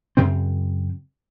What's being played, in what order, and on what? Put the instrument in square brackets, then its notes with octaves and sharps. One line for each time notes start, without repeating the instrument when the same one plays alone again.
[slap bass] F#2 C#3 C4